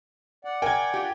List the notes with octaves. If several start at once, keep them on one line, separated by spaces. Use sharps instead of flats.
D5 F#5
A#4 G5 G#5 G#6
F4 G4